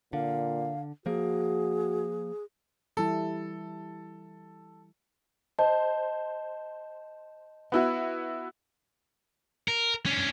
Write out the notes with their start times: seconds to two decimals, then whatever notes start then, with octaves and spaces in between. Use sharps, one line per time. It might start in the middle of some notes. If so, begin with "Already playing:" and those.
0.13 A#2 D3 F5
1.06 F3 A#3 F#4 G#4
2.97 E3 G3 E4 A4
5.59 C5 D#5 A5
7.72 B3 E4 F#4
9.68 A#4
10.06 C#4 D4